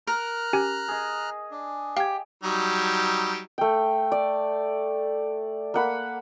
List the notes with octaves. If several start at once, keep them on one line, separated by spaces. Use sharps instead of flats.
A#4 A#5 F6 F#6
C#4 G4 G#5
G#4 D#5
D4
G4 F5 G#6
F#3 G3 D#4
A3 G5
D5
A#3 F#5 B5